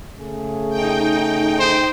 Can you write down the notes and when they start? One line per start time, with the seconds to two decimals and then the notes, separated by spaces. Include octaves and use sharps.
0.18 C#3 A3 G#4
0.70 D#4 G5
1.59 C5